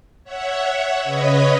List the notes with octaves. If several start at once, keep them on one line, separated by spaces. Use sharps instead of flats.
C#5 E5 F#5
C#3 B4 C#5 D#5 B5